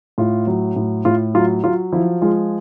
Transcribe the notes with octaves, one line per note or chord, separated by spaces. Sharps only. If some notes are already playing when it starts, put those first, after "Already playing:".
A2 F4
F#3
A2
A2 F4
F#3 F4
F#3 F4
F3 E4
G#3 F4